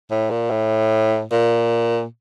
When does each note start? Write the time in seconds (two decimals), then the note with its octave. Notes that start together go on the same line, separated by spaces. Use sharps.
0.11 A2
0.31 A#2
0.51 A2
1.32 A#2